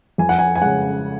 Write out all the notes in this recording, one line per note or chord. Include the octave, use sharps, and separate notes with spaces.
F2 G#5
F#5
G#5
G#5
C#3 G#3 F#5